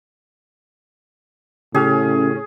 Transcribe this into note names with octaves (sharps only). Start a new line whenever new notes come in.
A2 C#3 C#4 G4 G#4 F6